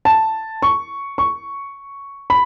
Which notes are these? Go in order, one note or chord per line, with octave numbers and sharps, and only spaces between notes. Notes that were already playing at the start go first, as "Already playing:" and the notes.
A5
C#6
C#6
B5